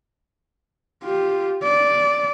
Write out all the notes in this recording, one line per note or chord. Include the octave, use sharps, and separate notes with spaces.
F4 G4
D5